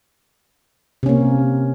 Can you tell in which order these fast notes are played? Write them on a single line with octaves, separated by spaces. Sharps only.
C3 C#4 A#3